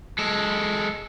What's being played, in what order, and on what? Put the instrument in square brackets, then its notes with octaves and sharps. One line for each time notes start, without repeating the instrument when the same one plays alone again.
[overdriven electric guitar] G#3 A4